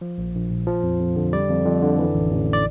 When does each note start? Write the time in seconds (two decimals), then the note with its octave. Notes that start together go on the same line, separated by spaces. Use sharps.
0.01 F3
0.18 A#1
0.35 A#1
0.51 A#2
0.67 F3
0.83 F2
1.01 F2
1.16 D3
1.33 G3 D5
1.49 F2
1.66 F2
1.82 D3
1.99 E3
2.14 A1
2.32 A1
2.48 A2
2.53 D5